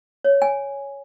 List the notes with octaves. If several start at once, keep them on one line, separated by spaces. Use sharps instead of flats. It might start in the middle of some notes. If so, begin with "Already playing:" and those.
C#5
G#5